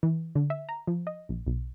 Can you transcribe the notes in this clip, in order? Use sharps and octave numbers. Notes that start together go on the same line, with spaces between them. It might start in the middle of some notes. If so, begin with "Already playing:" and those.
E3
D3
E5
A#5
F3
D#5
A#1
B1